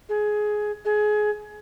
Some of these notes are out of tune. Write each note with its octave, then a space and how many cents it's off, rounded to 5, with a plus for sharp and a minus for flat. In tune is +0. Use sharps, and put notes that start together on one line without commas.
G#4 +15
G#4 +25